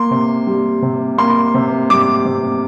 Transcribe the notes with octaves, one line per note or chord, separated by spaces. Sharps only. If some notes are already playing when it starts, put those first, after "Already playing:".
Already playing: A#3 C6
C3
G3
C3
A#3 C6
C3
G3 D6
C3